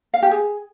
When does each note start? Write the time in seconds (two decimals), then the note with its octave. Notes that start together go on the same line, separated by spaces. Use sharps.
0.14 F5
0.22 G4
0.31 G#4